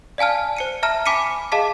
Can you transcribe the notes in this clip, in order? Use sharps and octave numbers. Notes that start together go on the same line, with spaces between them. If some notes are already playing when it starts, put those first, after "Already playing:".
D5 F5 G#5 A5 F6
C5 C#7 D#7
E5 A5 A#5 F6
G#5 B5 D6 B6 C#7 D#7
G#4 D#5 F5 A5 D6 B6